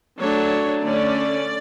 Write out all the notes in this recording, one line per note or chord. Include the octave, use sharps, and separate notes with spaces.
F#3 A3 D4 C#5
D3 A3 C#4 D5